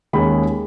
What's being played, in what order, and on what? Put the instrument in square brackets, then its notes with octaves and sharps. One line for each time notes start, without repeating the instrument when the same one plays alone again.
[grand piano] D#2 D#3 G#3 C#4 B5